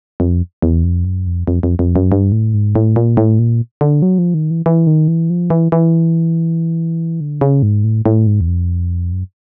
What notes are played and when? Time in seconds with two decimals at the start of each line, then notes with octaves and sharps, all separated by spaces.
0.20 F2
0.62 E2
0.84 F2
1.05 F#2
1.27 F2
1.47 F2
1.63 F2
1.79 F2
1.96 F#2
2.12 G2
2.32 A2
2.54 G#2
2.75 A2
2.96 A#2
3.17 A2
3.39 A#2
3.81 D3
4.02 F#3
4.18 F3
4.34 D#3
4.51 E3
4.66 E3
4.87 D#3
5.08 E3
5.30 F3
5.50 E3
5.72 E3
7.21 D3
7.41 C#3
7.63 G#2
7.84 A2
8.06 A2
8.27 G#2
8.41 E2
8.48 F2
9.12 F#2